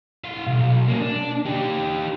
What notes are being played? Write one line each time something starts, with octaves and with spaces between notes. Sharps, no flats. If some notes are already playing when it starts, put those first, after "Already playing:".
E4 F5
B1
A#3 C#4
D4
D#4 G4